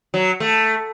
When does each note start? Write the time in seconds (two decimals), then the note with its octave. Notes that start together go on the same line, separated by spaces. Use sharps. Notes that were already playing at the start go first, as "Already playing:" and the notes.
0.14 F#3
0.40 A3